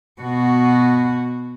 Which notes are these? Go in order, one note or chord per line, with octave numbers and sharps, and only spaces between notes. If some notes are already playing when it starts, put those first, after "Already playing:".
B2 F#4